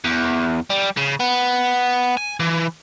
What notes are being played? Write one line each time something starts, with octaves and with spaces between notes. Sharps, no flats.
E2
G3
C#3
B3
G#5
E3